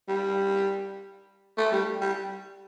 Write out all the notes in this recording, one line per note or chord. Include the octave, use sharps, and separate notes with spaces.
G3
A3
G3
G3